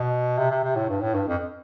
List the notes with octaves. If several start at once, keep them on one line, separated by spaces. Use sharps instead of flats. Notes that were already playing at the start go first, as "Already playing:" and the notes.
Already playing: B2
C3
C3
C3
A2
G2
A2
G2
F2